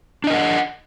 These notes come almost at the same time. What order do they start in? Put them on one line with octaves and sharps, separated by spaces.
D4 D#5 A#4 F#5